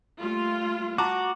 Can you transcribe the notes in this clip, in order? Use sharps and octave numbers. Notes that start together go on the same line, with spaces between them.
G3 A3 A#3 F4
F#4 A5 A#5 D6